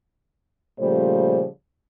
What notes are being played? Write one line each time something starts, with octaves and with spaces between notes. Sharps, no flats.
A#2 C#3 F3 G3 A3 C5